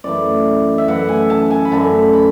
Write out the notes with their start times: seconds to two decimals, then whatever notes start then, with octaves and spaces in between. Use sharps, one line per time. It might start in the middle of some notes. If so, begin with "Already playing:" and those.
0.04 F#2 E3 A3 D5
0.78 E5
0.88 F#2 E3 A3 F#5
1.09 G#5
1.30 A5
1.50 G#5
1.65 B5
1.72 F#2 D3 A3 C#4 A5
2.13 B5